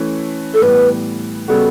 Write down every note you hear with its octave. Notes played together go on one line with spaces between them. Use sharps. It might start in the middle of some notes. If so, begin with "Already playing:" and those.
Already playing: E3 A3 C#4
A4
A2 E3 G3 B3 B4
C#3 G3 B3 F#4 A4